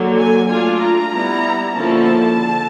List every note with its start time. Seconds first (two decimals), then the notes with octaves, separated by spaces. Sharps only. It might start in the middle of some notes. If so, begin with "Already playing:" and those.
Already playing: D3 F#3 A#3
0.17 G#5
0.48 A3 D4 F4 G#5
0.80 A#5
1.12 G3 B3 E4
1.75 D3 F3 A#3 C#4 E4 A5
2.38 D3